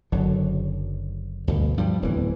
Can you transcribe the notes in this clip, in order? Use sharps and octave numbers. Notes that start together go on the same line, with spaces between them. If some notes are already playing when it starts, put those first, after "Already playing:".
F#1 D3 F#3
D2 G2 B2
G2 F3 G3
D1 E2 G#2 E3